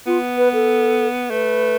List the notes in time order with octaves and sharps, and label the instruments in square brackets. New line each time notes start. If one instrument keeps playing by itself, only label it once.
[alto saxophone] B3 [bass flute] F4
[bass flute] B4
A4
[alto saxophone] A3 [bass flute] B4